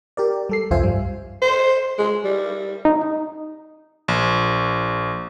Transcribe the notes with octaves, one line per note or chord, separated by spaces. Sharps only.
G4 A#4 D5
G3 A4 C7
C2 F2 F4 C5 E5 G#5
G2 G3
C5
G#3
G3
D#4
A#1